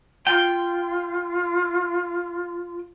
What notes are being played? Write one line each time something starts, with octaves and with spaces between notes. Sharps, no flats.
F4 G5